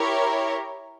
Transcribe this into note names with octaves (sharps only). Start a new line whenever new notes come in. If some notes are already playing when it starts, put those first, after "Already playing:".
Already playing: E4 G4 A#4 C#5